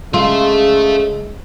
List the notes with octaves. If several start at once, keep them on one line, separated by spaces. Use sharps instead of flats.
C#3 G#3 F4 A4 E5